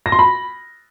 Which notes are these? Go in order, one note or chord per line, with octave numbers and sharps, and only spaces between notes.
A#6
C6
B5